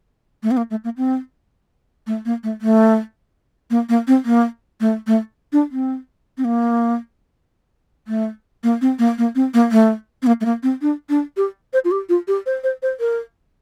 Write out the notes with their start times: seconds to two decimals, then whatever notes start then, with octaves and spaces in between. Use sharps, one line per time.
0.43 A3
0.51 C4
0.57 A#3
0.70 A3
0.84 A#3
0.97 C4
2.07 A3
2.25 A#3
2.43 A3
2.62 A3
3.70 A#3
3.89 A#3
4.07 C4
4.25 A#3
4.80 A3
5.07 A3
5.53 D4
5.71 C4
6.38 C4
6.45 A#3
8.08 A3
8.63 A#3
8.81 C4
8.99 A#3
9.18 A#3
9.35 C4
9.54 A#3
9.72 A3
10.22 C4
10.27 A#3
10.41 A3
10.45 A#3
10.63 C4
10.82 D4
11.09 D4
11.37 G4
11.73 C5
11.85 F4
11.91 G4
12.09 F4
12.28 G4
12.46 C5
12.64 C5
12.82 C5
13.00 A#4